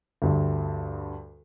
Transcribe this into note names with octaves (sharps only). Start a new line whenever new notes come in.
D2 G2